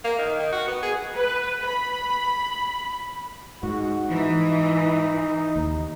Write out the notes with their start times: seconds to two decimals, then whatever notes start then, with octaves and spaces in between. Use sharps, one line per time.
0.05 A#3
0.19 D#3
0.39 D#3
0.53 F#4
0.68 B3
0.83 G#4
1.17 B4
1.67 B5
3.63 G#2 F#4
4.10 E3 D#4
5.56 D#2